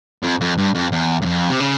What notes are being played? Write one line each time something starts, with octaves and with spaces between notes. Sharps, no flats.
F2
F2
G2
F2
E2
G2
F2
C3
C#3